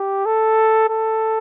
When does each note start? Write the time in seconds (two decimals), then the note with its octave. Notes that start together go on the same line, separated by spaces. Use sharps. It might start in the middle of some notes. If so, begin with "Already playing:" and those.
Already playing: G4
0.26 A4
0.89 A4